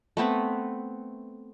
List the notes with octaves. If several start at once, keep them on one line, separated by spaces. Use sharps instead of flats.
A3 B3 C4 B4